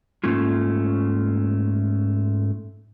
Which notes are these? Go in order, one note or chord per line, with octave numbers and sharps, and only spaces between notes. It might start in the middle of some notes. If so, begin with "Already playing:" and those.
G#2 A3 A#3 C#4 F4